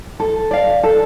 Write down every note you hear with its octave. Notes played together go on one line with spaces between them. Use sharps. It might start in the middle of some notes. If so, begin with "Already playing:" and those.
A4
D5 F5
A4